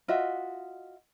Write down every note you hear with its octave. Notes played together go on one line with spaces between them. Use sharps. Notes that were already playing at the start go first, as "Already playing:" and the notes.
F4 F#4 D#5 E5